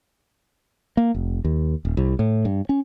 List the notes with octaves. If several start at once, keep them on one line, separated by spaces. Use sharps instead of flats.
A#3
F1
D#2
D#1
C2
A2
G2
C#4